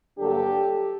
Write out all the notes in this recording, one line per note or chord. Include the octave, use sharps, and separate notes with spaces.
G2 D3 F#3 A#3 D4 G4 A4